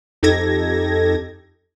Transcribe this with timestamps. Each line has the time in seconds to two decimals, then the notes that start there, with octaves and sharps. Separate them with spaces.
0.23 F2 D#4 G4 A4 G#6 A#6